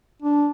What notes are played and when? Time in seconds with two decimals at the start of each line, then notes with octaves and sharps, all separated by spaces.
0.22 D4